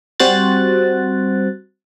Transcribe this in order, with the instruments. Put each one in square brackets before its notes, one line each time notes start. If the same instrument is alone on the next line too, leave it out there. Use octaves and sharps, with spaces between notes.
[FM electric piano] G3 C4 F#4 C5 F#6 A6